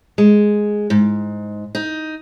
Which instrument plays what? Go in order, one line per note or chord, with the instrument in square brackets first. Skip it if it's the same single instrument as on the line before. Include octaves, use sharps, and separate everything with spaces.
[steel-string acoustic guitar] G#3
G#2
D#4